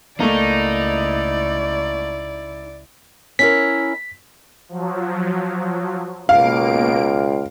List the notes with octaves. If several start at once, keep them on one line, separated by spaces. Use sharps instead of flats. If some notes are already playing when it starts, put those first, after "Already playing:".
C#2 A3 A#3 D#4 E4 D5
C#4 E4 A#4 B6
F3 F#3
C#2 B2 A#3 F5 D7